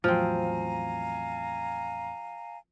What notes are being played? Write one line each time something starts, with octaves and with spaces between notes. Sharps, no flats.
E2 A2 F3 F#3 C4 F5 G#5 A#5